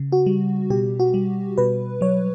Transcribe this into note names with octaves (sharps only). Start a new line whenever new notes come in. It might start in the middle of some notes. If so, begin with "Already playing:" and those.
Already playing: C#3
F#4
G3
B2 G4
F#4
G3
B2 B4
F#3 C#5